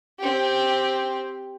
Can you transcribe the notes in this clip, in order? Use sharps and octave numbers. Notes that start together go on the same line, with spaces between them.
C4 G4